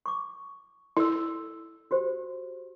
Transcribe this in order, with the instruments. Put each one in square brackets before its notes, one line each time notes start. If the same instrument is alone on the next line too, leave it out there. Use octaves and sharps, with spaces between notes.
[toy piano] C#6 D6
[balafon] E4 [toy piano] A4 E6
[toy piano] F#4 G4 C5